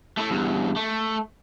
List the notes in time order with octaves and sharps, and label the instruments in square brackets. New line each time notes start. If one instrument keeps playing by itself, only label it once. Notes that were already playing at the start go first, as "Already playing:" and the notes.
[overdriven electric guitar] A3 E4
E2 G2
A3